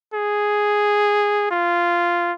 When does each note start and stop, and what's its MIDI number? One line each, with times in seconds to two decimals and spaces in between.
0.14 1.46 68
1.51 2.32 65